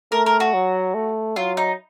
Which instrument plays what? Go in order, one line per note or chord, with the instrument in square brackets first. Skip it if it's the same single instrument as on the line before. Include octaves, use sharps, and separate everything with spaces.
[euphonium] A3 [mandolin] A#4
[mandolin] A#4
F#4
[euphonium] F#3
A3
[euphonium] F#3 [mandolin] F4
[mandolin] D#4